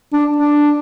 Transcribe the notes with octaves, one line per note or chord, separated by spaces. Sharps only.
D4
D4